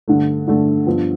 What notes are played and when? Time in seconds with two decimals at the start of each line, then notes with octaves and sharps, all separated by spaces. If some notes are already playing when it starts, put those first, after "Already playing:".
0.08 G2 D3 A3
0.47 G2 D3 A3
0.86 G2 F3 B3 F4